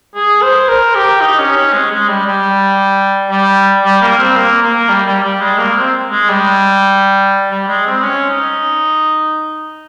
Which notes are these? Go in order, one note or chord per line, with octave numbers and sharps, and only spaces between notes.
G#4
C5
A#4
G4
D#4
C#4
C#4
G#3
G#3
G3
G3
G3
G3
A#3
C4
A#3
A#3
G3
G3
G3
G#3
A#3
C4
G#3
G3
G3
G#3
C4
C#4
D#4